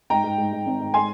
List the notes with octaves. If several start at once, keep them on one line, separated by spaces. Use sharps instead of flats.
G#2 G5 A#5
G#2
G#2
G#2
G#1
G#2
G#5 C6